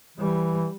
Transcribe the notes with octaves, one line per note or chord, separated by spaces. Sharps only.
E3 G3